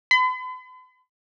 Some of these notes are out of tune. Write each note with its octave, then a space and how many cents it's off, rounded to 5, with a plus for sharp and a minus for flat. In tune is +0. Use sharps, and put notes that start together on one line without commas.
B5 +45